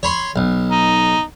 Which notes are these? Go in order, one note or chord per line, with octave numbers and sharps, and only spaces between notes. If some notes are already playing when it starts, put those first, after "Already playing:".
C#5 B5 C6
B1
D#4